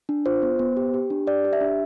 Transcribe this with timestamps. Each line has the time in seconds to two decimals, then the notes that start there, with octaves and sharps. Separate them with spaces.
0.09 D4
0.26 F4 C5
0.42 B3
0.59 B3
0.77 G4
0.94 G4
1.10 D4
1.27 G4 D5
1.45 G4
1.53 E5
1.61 D4